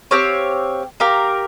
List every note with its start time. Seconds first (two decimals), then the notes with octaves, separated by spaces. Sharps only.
0.11 C4 G4 C#5 F5
1.00 G4 A#4 F5